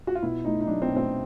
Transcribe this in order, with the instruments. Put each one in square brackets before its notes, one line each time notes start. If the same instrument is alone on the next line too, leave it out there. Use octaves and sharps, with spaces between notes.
[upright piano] F#4
F4
B2 E4
A3 D#4
D#4
F#3 D4
C4
B2
C4